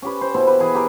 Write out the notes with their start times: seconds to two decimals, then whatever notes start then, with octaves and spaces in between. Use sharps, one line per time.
0.02 C#4 G4 B4
0.21 C5
0.34 B2 E4 C5
0.47 G4 B4
0.60 E3 G#4 B4
0.75 G4 A#4